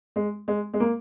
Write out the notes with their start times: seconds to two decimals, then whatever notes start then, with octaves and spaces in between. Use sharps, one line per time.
0.16 G#3
0.48 G#3
0.74 G#3
0.80 A#3